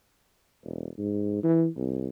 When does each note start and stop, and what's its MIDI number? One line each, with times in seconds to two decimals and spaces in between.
0.64 0.88 28
0.98 1.40 44
1.43 1.68 52
1.76 2.07 36